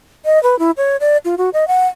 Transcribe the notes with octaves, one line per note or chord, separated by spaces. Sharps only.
D#5
B4
E4
C#5
D5
F4
F#4
D#5
F#5